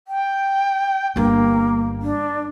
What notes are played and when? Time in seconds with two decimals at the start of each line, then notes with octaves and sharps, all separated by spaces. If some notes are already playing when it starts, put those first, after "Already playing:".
0.08 G5
1.16 G1 G2 A#3
2.02 D4